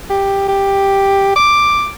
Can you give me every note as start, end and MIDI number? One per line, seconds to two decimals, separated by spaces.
0.10 0.44 67
0.48 1.35 67
1.36 1.90 86